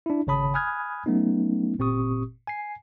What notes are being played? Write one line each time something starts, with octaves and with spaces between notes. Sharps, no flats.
D4 E4
G#1 C#3 C#5 A5 B5 D#6
G#5 B5 D#6 F6 F#6 G#6
F#3 A3 B3 C#4 D#4
G1 A#2 C4 G4 C#6 D#6
G#5 C7